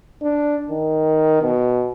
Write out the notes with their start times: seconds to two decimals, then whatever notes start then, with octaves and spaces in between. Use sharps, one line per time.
0.22 D4
0.70 D#3
1.42 B2